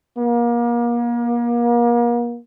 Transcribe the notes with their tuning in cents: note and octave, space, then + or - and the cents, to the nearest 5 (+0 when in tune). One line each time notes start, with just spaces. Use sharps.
A#3 +35